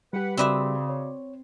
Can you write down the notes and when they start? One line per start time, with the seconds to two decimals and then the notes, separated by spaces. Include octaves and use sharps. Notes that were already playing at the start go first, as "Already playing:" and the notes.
0.13 G3 G4 B4 F#5
0.37 C#3 C4 F#4 B4 D5 E5 D6
0.90 C#5